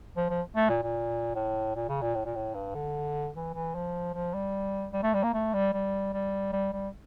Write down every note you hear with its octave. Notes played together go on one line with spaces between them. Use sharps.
F3
F3
A3
A#2
A#2
A2
A#2
C#3
A#2
A2
A#2
A2
G2
D3
E3
E3
F3
F3
G3
G3
A3
G3
A#3
A3
G3
G3
G3
G3
G3